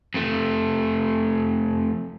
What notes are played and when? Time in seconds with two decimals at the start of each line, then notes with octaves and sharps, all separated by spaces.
0.14 F2 A3